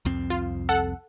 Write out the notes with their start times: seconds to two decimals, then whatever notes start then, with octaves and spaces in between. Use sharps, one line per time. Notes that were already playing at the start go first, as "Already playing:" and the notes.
0.05 C2 F2 C4
0.30 F4
0.69 A4 F#5